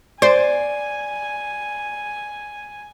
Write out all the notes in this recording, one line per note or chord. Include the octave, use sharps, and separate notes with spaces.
C5 D5 G#5